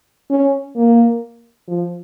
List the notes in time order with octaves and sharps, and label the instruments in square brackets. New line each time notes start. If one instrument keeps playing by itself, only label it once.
[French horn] C#4
A#3
F3